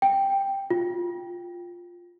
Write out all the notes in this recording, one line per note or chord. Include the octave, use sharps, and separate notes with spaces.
G5
F4